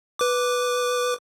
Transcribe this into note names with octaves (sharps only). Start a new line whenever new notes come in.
B4 D6